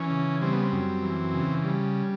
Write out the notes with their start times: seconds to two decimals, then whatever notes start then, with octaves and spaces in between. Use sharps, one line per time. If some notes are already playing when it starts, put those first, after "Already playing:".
Already playing: E3 C#4
0.10 C#3
0.41 G3 C4
0.53 B3
0.64 C4
0.72 F#2
1.02 E3
1.33 C#3
1.64 G3